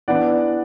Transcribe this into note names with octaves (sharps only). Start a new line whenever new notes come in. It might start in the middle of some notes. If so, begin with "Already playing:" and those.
E3 B3 D4 D5 F#5